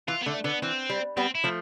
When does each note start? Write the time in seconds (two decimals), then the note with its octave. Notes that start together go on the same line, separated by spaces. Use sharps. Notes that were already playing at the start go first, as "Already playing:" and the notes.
0.08 E3 F4
0.22 B3
0.26 D3 A3
0.44 D3 B3
0.62 E3 C4
0.90 G3
1.17 G3 B3 C4
1.35 E4
1.44 F3 A3